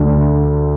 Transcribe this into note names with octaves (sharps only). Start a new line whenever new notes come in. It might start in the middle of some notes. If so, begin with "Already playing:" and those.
Already playing: D2 D3